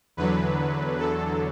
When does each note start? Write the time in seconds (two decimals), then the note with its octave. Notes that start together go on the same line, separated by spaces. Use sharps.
0.17 E2 D3 F#3 B4
0.99 A4